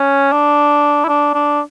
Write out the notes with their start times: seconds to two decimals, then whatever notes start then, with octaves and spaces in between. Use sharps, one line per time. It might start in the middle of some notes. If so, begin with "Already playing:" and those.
Already playing: C#4
0.32 D4
1.05 E4
1.08 D4
1.34 D4